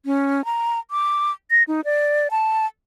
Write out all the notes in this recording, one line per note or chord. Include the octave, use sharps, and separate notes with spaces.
C#4
A#5
D6
A#6
D#4
D5
A5